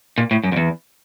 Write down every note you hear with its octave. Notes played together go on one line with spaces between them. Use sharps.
A#2
A2
F#2
F2
E2